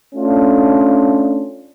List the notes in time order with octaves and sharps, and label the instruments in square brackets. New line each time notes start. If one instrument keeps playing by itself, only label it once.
[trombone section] A3 C#4 D4 F4